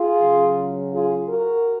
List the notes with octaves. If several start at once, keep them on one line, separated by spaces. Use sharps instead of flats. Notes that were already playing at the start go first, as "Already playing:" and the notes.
Already playing: F4 G#4
C#3 F#3
F4 G#4
F#4 A#4